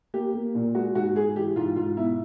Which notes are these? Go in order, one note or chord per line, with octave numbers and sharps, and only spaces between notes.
A#3 G4
A#3
A#2
G#3 F#4
G#2 F#4
G#3 G#4
E3 G4
G#2 F4
G#2 F4
B2 E4